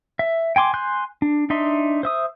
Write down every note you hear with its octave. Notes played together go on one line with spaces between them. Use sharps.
E5
G5 G#5 C6 D6
G#5 C6 F#6 G6
D4
D4 D#4 E5 C6
C5 E5 D#6